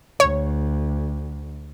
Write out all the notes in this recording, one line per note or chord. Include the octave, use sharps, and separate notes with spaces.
D2 C#5